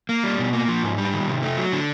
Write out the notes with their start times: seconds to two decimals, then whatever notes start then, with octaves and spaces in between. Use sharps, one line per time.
0.09 A#3
0.24 G3
0.38 B2
0.53 A#3
0.68 F3
0.83 G#2
0.98 G3
1.13 D#3
1.28 C3
1.43 A3
1.57 F#3
1.72 D3